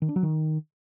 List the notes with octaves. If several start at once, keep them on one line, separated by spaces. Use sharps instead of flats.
D#3
D4
F#3
D#3